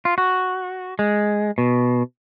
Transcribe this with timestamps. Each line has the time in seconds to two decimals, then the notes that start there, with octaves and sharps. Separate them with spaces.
0.05 F4
0.18 F#4
0.99 G#3
1.58 B2